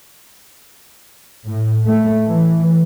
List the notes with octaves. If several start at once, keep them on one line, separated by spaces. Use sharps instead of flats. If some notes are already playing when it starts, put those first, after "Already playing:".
A2
A3
E3